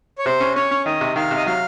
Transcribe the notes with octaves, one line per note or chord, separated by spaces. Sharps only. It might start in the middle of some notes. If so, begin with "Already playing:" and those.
C#5
C3 C5
C#4
C#4 C#5
C#4
D#3 D#5
C3
D#3 F5
C3
D#5
F#3 F5